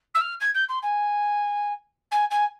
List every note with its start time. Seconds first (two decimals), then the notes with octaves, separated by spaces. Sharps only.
0.14 E6
0.21 F6
0.40 G#6
0.54 G6
0.68 C6
0.82 G#5
2.11 G#5
2.30 G#5